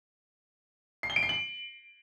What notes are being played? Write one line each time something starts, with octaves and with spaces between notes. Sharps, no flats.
C7
G7
D7
C7
F#7